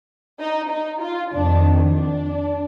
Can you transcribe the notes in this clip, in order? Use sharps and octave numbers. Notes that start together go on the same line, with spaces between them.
D#4
D#4
F4
F2 D#3 D4
D4